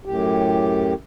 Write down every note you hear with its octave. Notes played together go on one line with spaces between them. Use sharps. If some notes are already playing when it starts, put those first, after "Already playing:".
F#2 A2 G4